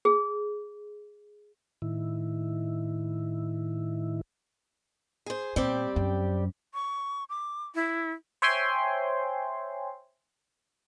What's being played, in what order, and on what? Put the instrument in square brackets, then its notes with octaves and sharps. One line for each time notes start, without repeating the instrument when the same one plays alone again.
[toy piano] G#4
[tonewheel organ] A2 D#3 E4
[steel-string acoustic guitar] G#4 C5
[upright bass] A#2 [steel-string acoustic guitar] G3 C4 G4
[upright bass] F#2
[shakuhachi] C#6
D6
E4
[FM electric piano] C5 C#5 E5 G5 G#5 C6